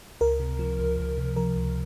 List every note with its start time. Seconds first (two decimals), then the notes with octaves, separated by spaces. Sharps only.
0.21 C#2 A#4
0.40 C3
0.59 F3
0.79 C#2
0.99 C#2
1.18 C3
1.36 F3 A#4
1.57 C#2